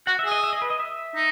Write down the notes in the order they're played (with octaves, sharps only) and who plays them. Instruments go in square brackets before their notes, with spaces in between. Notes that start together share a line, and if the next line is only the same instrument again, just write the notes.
[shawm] F#4 [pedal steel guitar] F#5
[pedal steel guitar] E5
[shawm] G#4
[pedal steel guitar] D#5
E5
D#5
B4
D#5
E5
[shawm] D#4